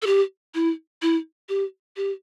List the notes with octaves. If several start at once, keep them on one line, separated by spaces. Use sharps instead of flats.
A4
G4
E4
E4
G4
G4